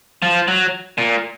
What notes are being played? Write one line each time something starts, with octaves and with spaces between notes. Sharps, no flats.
F3
F#3
A#2